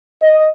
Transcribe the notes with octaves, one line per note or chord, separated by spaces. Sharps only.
D#5